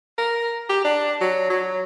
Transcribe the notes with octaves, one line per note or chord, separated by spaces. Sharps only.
A#4
G4
D4
F#3
F#3